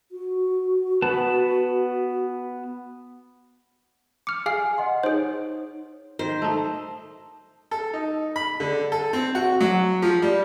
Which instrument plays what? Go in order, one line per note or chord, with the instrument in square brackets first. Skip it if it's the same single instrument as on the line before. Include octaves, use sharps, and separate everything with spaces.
[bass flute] F#4
[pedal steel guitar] B3 B4 A5
[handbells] D6 F6 [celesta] C#7
[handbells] G#4 F5 F6 [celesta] G#5
[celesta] D#5 F#5 C6
[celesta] D#4 C#5 [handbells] G#4 C5
[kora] D#3 [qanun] C5
[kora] A3 D#4
[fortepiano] A4
D#4
B5
D3
A4
C4
F#4
F#3
F3
G3